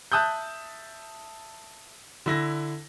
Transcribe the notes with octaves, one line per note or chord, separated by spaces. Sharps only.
E5 A5 D#6 F#6 G6
D3 E4 A#6